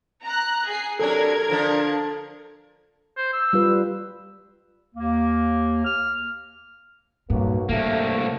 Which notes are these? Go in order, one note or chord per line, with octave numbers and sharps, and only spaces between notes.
A#5 F#6
G#4 C7
C3 F#3 D4 A4 A#4 G#6
D3 F3 D4
C5
E6
G3 F4 B4
D#2 A#3
F6
B1 G2 A#2 A#3 F#4
C2 G#2 A3 A#3